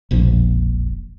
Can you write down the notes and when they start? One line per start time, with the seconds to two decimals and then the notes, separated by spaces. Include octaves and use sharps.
0.11 E1 A#1 F2 F3